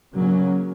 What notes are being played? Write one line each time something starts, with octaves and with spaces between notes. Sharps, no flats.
C#3 F#3 A#3 C#4